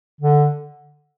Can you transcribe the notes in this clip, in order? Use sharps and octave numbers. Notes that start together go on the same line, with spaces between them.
D3